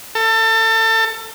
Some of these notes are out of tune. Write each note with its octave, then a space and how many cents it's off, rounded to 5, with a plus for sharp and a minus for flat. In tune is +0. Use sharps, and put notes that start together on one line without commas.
A4 +30